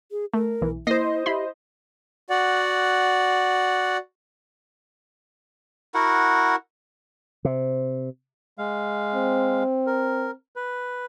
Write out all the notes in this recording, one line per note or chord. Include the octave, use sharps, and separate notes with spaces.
G#4
A3 A#4
B1 E3
A#3 E4 C5 D#5 A#6 C7
E4 G4 B5 C6
F#4 D5 F#5
E4 F#4 A#4 F#5
C3
G#3 F5
C4
A#4
B4